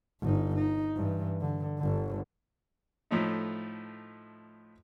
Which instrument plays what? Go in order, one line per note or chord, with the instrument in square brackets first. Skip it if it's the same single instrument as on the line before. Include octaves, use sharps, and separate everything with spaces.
[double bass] G1 D#4
D#4
G2 E3
D3
G1 D3
[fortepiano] A2 F3 A3 D#4